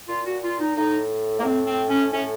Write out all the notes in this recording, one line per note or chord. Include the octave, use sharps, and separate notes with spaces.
A#2 F4
F#4
F4
D#4
A2 D#4
A#3
A2 C4
C4
C#4
A2 C#4